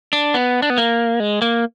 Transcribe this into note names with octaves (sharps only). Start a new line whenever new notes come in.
D4
B3
D4
B3
A#3
G#3
A#3